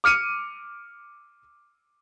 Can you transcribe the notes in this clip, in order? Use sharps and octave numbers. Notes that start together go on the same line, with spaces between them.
D6 F6 C#7 D#7